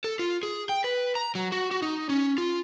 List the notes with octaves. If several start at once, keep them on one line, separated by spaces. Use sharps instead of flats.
A4
F4
G#4
G5
B4
A#5
F#3
F#4
F#4
D#4
C#4
F4